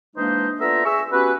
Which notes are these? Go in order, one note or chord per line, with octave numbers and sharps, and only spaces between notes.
E3 G#3 A#3 D4 D#4 C5
B3 F4 A4 D5 E5 A#5
G#4 E5 C#6 E6
B3 C#4 F#4 G4 B4